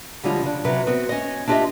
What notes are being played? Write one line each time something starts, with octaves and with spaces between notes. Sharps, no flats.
D3 F3 G3 G#3 C#4 F4
C#3 D4
C3 F#3 C#4 B4
B3 C4 F#4
C#4 D#5
D4 E4 F4 G4 D#5 E5